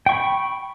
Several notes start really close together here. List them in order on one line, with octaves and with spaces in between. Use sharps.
G5 C#6 B5